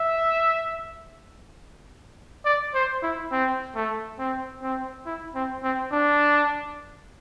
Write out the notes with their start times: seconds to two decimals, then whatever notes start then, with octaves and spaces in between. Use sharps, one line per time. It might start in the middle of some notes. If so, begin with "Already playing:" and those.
Already playing: E5
2.45 D5
2.74 C5
3.03 E4
3.32 C4
3.76 A3
4.19 C4
4.62 C4
5.06 E4
5.35 C4
5.64 C4
5.92 D4